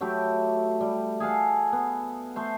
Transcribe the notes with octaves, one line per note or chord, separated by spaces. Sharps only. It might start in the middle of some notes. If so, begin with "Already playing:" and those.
F#3 A3 E4 G4
G3
G#4 A4 F5 F#5
B3
A3 C5